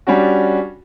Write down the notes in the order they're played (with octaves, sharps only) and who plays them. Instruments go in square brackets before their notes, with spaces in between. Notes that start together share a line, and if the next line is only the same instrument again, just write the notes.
[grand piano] G3 C#4 D4 F#4